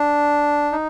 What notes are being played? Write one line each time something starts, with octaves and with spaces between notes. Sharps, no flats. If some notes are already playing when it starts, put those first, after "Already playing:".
Already playing: D4
D#4